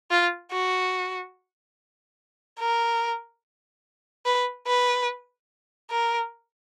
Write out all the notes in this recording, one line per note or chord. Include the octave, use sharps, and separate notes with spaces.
F4
F#4
A#4
B4
B4
A#4